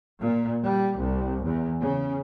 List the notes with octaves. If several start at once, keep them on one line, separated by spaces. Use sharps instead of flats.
A#2
G3
C2
E2
C#3